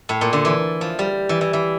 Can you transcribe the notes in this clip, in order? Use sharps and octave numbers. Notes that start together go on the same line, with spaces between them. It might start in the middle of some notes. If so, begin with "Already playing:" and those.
A2
A#2
D3
E3
F3
G3
E3
E3
E3